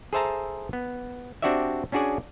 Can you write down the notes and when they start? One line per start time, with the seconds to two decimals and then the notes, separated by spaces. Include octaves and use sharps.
0.13 G#4 A4 C5 E5 A5 A#5
0.73 B3
1.42 C4 D4 F#4 G4 D5 E5
1.92 C#4 D4 F#4 G#4 D5 G#5